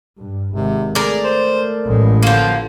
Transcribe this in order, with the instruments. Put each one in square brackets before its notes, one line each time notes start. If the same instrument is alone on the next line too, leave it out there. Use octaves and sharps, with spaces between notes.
[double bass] G2
[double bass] G#1 [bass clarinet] C3
[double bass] A3 [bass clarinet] G#4 [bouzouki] A#4 D5
[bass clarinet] C5
[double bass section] A1 [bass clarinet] G#3
[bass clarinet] D3 [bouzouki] F3 A#3